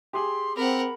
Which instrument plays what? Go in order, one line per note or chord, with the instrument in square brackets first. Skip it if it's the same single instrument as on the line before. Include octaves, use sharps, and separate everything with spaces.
[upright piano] G4 G#4 [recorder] C6
[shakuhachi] C4 [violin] A#4 F#5 [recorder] B5